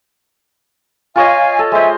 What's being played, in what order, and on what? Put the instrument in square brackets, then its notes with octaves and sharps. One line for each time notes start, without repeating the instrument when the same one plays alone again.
[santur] F4 C#5 D#5 [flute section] F5 G#5
[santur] A4
[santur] G#3 C5 [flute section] E5 G#5